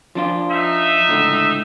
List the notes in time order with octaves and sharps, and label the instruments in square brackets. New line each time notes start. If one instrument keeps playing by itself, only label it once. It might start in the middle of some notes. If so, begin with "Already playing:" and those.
[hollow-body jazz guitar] F3 D4 F4
[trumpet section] D#4 E5
[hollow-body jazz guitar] C#2 A2 D3